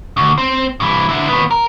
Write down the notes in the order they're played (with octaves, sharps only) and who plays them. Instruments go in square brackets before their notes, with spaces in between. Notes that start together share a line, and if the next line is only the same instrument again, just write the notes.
[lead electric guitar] D2
C4
G2 E3
D3 E4
D#2 B3
A#4